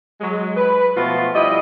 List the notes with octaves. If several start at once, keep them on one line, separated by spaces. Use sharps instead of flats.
F#3 G#3
B4
B2 F3 A3 F4
G3 E4 D#5